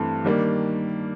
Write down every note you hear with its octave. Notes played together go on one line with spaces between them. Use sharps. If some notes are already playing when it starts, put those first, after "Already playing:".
Already playing: G2 E3 A3 C4
D#3 G3 A#3 D4